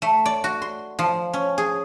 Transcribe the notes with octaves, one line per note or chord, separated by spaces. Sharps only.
A3
D5
F#4
C6
F3
C#4
G#4